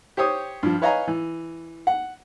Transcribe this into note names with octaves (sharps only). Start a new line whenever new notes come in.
G4 C5 C#5 D#6
G2 F3
B4 C#5 D#5 F5 G#5 A#5
E3
F#5